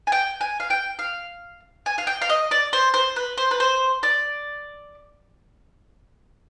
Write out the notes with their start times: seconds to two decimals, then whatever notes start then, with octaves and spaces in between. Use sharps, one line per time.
0.07 G#5
0.12 G5
0.41 G#5
0.60 F5
0.70 G5
0.99 F5
1.86 G#5
1.98 F5
2.07 G5
2.22 F5
2.29 D#5
2.51 D5
2.73 C5
2.94 C5
3.16 B4
3.38 C5
3.51 B4
3.60 C5
4.03 D5